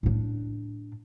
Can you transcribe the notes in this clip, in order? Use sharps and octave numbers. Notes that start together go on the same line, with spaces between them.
A2 D4